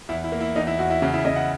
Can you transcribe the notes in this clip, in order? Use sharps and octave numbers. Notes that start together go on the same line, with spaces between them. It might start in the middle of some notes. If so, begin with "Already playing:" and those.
E2 E4
E4
A#3
E4
E2 D#4
E4
E2 F#4
E4
C#3 F#4
E4
C#3 D#5
F#5